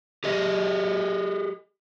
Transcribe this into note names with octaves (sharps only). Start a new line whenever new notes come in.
G4 G#4 D#5